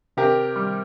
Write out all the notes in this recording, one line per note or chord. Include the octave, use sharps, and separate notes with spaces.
C3 G4 A#4
G3